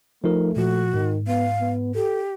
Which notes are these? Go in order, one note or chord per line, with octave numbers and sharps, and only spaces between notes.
F3 A3 D#4 A#4
A#2 F3 F#4
G#2 D#3
B3 F5
B3
G4 A4